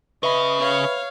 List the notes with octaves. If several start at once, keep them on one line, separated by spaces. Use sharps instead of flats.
C#3 B4 D#5 E5 B5
C#5 F5